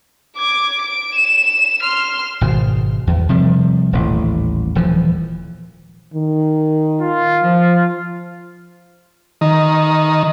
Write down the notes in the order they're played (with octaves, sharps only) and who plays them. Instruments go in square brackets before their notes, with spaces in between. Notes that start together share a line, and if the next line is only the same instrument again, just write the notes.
[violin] D6 G#6
D7
E7
C6 F6
[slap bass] G#1 B2
E2
C3 F3 G3
D#1 A1
D#1 E3 F3
[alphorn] D#3
[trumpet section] F4
[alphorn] F3
[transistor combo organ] D#3